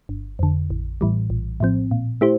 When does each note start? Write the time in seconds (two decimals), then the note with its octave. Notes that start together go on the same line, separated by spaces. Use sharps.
0.09 G1
0.39 F2 D3
0.70 A1
1.01 A2 E3 G3
1.30 A#1
1.60 A2 F3 C4
1.91 A#2
2.21 A3 E4 G4 C5